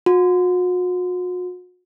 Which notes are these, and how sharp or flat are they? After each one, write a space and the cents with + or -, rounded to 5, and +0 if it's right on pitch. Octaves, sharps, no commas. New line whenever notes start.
F#4 -40